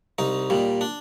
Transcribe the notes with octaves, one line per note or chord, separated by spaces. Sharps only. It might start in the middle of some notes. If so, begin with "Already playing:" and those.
C2 D#4
A#2 G3
D4